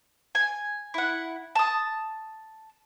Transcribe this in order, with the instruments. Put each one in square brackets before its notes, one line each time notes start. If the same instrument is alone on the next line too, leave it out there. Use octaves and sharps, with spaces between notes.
[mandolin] G#5
E4 F#5
A5 D#6